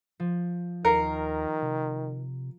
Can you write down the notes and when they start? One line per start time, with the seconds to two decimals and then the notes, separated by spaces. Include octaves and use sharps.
0.20 F3
0.85 D#2 D#3 A#4 C7 C#7
1.62 C3